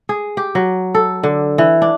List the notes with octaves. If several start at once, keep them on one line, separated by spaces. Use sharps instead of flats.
G#4
G4
F#3
A4
D3
E3
D4